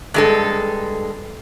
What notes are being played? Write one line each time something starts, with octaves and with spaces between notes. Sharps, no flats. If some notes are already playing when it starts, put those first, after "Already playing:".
G2 G#3 A4